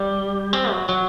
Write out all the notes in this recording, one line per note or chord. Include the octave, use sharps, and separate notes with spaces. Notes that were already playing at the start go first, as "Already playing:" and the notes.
Already playing: G3
C4
F#3
F#3